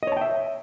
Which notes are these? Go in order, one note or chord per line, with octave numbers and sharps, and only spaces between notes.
C#5 D#5 E5 G5 A5